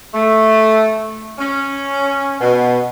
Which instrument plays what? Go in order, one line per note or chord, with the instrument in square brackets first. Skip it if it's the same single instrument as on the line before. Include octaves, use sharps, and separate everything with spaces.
[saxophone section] A3
C#4
B2